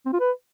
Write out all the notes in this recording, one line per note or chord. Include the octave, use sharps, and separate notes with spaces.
C4
F4
B4